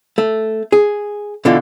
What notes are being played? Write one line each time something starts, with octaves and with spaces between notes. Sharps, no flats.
A3
G#4
B2 D3 E3 F4